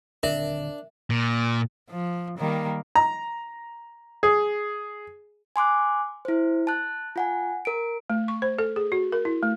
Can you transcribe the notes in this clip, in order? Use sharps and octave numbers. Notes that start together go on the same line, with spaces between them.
D#1 D3 C4 D4 A#4 E5
A#2
F3
D#3 G3 A#3
A#5
G#4
G#5 C6 D6 F#6
E4 C5
A5 F#6
F4 F#5 G#5
A#4 D7
A3
C#6
C5
A4
G#4
F#4
A#4
E4
A3